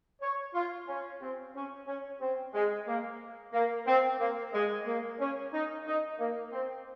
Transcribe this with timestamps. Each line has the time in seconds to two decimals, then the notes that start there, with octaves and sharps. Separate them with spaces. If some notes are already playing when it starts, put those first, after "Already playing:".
0.22 C#5
0.54 F4
0.88 C#4
1.21 C4
1.55 C#4
1.87 C#4
2.21 C4
2.54 G#3
2.87 A#3
3.53 A#3
3.87 C4
4.20 A#3
4.53 G#3
4.86 A#3
5.20 C#4
5.52 D#4
5.86 D#4
6.19 A#3
6.52 C4